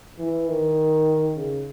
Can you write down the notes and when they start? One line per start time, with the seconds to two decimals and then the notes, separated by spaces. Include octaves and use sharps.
0.19 E3
0.48 D#3
1.36 C#3